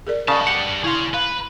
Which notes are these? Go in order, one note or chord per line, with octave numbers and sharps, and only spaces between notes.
G#4 A#4 D5
C#3 D5 D#5 F5 A5
D4 G4 F#5
E4 G#4 F5 C6
B4 F5